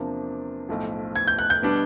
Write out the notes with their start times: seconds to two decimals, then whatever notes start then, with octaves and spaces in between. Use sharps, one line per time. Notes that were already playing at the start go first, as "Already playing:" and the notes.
Already playing: E2 C3 F3 A#3 D4
0.69 B1 A2 F3
1.16 G#6
1.28 G6
1.39 F#6
1.50 G6
1.62 B2 G3 B3 D4